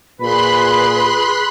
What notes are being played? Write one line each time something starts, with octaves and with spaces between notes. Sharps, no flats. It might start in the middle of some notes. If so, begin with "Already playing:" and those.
A#2 G#4 B4 B5 C6 F#6